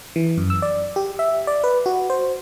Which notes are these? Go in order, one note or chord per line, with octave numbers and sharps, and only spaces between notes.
E3
F#2
E6
D5
G4
E5
D5
B4
F#4
C5